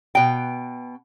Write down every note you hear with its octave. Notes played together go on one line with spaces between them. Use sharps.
B2 G5